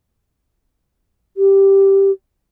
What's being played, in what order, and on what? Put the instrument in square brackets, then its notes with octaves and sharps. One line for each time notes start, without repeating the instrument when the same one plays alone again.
[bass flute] G4